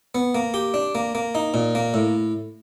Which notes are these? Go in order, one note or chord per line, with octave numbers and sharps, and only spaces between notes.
B3
A#3
G4
D4
A#3
A#3
D#4
A#2
A#3
A2